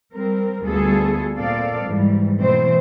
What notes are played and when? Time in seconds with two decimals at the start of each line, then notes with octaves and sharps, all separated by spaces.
0.15 G3 C4 A#4
0.64 D2 G3 B3 F4 G#4 A4
1.37 A#2 C4 A4 D5 F5
1.85 G#2 E3 G3
2.37 B2 E3 A3 C4 C5